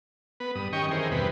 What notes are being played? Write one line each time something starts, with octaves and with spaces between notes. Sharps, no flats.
B3 B4
G2 D#6
D#3 C#4 G4 D#5 G5 C#6
D#3 E3 G#4 A#4 C5
E2 G2 B2 C4 B4